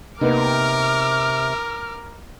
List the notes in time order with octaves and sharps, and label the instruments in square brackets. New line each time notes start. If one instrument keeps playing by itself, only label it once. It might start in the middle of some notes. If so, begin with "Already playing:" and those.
[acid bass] C3 [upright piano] A#3 B3 D#4 [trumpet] A#4 [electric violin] D6 F6